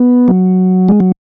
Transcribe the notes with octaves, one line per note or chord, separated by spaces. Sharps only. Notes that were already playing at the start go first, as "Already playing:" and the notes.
Already playing: B3
F#3
G#3
F#3